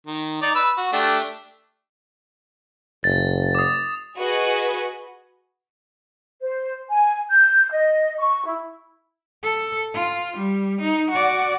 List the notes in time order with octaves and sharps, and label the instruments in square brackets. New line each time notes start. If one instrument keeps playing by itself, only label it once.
[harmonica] D#3
D#4 D5
B4 E6
F#4
A3 D4 G4
[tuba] F#1 [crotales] A6
[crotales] D6 D#6
[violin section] F#4 G#4 B4 D#5
[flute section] C5
G#5
G6
D#5
C#6
E4
[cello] A4
F4
G3
D#4
F#4 D5